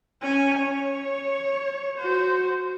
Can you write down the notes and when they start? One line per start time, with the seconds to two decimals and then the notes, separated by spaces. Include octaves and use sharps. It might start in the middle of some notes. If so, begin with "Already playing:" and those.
0.22 C#4 G#5
0.58 C#5
1.98 F#4 C5